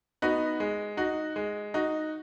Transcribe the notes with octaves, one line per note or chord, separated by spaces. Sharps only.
B3 D#4 F#4
G#3
D#4 F#4
G#3
D#4 F#4